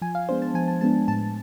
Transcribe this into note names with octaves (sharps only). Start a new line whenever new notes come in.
F3 G#5
F5
G#3 B3 D4 C5
A5
F3 G#5
A5
G#3 B3 D4 A5
A2 A5